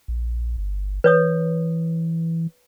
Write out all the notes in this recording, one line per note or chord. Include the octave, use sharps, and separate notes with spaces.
A#1
G1
E3 B4 C#5 D#6